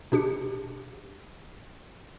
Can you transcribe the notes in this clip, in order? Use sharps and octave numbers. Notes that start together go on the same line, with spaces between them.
B2 D4 G4 C#7